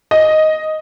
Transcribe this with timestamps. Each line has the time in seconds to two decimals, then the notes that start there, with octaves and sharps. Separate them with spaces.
0.11 D#5